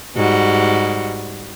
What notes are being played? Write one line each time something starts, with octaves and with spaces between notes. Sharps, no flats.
G#2 G3 F#4